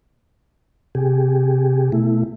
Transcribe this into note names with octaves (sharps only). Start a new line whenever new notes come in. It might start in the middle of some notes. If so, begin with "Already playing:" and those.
C3 G4 G#4
B2 A3 E4